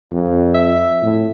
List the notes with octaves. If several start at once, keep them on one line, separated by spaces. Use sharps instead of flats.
F2
E5
A2